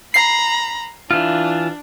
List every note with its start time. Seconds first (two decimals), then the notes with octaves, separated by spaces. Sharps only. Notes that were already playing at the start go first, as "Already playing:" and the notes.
0.14 A#5 B5 C7
1.11 E3 D4 F4